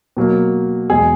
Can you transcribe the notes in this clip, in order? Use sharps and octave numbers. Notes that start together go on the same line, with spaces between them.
B2 F#3 A#3
E2 B2 G#3 G#4